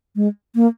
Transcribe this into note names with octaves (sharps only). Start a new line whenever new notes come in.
G#3
A#3